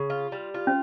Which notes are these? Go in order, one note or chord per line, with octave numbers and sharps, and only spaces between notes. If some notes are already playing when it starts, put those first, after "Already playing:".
Already playing: C#3
F4
G3
F4
C#4